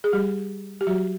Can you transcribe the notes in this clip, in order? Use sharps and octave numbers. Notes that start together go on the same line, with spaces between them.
G#4
G3 G4
G4
F#3 F#4